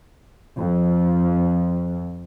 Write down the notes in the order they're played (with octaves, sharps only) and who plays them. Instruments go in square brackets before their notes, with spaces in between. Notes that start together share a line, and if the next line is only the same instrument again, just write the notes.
[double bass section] F2 F3